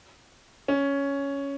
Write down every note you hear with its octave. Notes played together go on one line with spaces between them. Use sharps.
C#4